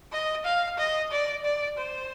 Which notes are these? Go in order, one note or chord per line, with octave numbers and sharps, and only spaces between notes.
D#5
F5
D#5
D5
D5
C5